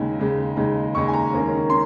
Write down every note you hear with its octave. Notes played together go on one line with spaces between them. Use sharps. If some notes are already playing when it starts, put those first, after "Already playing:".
Already playing: D#2 C#3 G#3 D#4
D#2 C#3 G#3 D#4
D#2 C#3 G#3 D#4
D#2 C#3 G#3 D#4 C#6
G#5
A#5
D#2 D#3 A#3 C#4
C#4 C6